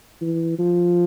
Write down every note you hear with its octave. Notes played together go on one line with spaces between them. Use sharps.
E3
F3